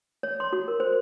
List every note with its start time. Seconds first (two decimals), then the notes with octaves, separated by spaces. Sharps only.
0.23 C#5
0.40 C6
0.53 F#4
0.68 A#4
0.80 C5